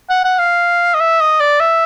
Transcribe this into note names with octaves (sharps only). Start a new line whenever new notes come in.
F#5
F#5
F5
D#5
E5
D#5
D5
E5